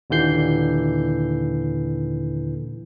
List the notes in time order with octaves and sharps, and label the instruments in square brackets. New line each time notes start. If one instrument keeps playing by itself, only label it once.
[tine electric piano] D#2 A#2 D3 E3 G6 C7